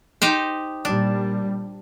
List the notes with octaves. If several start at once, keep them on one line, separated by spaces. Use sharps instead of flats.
D#4 G4 C5
A#2 G3 D4